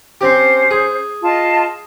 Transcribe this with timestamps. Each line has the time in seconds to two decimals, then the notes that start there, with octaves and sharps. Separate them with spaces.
0.21 C4 C#4 G4 C5
0.71 G#4
1.22 F4 D#5 A5